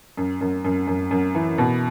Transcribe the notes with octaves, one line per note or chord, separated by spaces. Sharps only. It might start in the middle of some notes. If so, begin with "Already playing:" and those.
F#2
F#2
F#2
F#2
F#2
E3
B2